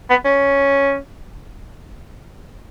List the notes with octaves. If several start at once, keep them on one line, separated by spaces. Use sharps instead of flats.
B3
C#4